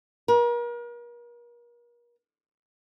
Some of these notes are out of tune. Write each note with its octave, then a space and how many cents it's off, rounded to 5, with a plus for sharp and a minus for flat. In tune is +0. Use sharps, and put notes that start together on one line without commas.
A#4 +40